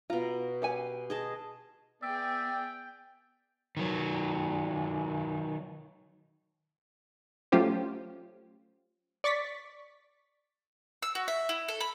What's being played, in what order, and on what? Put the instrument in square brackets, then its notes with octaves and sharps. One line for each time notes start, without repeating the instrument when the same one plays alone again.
[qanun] B2 A#5 [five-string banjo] F4
[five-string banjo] G4 F#5 G#5
[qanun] G#4 D#5 A5
[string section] B3 G#4 [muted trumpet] D5 [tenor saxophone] E5 [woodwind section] G5
[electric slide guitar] D#3 F#3
[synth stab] F#3 A3 C#4 F4 G4 C5
D5 C#6 A6 B6
[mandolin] E6
F#4
E5
E4
A4
B5